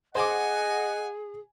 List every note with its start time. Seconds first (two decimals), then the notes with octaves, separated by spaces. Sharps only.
0.15 G#4 C5 D#5 F#5 G#5 D6